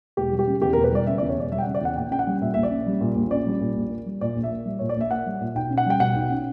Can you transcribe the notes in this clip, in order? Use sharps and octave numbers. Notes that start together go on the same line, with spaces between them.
E1 G4
G3
G4
C#3
E2 G4
A#4
E1
B4
G3 D5
C#3 E5
D5
E2
C#5
E1 D5
G3 E5
G5
F#5
C#3
D5
E2 F#5
A#1 G5
C#4 G5
F#5
G3
A#2 E5
A#1 E5
D5
C#4
G3
A#2
A#1
C#4 D5
G3
A#2
A#1
A#3
G3
A#2 D5
A#1
E5
A#3
G3
A#2 C#5
D5
A#1 E5
A#3 F#5
G3
A#2
B1 G5
C#4
F#5
G3 G5
B2 F#5
B1
C#4